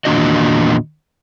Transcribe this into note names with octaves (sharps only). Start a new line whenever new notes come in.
E2 A#2 D#3 D4 F#4 D#5